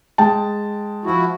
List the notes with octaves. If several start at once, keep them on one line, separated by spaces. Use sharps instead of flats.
G#3 G5 A5
F3 E4 F#4